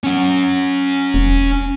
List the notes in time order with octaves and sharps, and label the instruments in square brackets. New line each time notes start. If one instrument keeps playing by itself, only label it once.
[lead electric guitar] C#4 F#5
[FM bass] E1